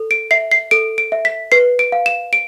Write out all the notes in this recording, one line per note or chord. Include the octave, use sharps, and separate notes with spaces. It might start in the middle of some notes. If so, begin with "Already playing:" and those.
Already playing: A4
D7
E5 C7
C7
A4 D7
D7
E5
B6
B4 C7
D7
F5
E7
D7